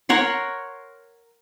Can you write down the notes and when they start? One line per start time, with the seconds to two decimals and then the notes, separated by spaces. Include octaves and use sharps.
0.09 A#4 C#5 F#5 C6